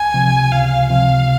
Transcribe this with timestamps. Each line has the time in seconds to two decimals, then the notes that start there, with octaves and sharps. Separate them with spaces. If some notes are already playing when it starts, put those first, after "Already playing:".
Already playing: C#2 G#5
0.14 C3 F3
0.52 C#2 F5
0.89 C3 F3 F5